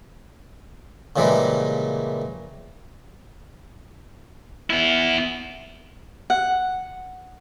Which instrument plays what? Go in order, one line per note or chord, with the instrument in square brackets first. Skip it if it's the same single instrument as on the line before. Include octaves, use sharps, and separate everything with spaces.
[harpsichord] A#2 C#3 E3 G3 G#3 A#3
[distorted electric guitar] B3 E4
[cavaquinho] F#5